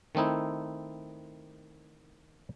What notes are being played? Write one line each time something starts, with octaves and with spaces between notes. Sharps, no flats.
D#3 A3 C4 D#4 E4